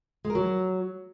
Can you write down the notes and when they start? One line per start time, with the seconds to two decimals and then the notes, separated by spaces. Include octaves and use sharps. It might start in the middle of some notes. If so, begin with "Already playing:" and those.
0.25 G#3
0.30 A#4
0.35 F#3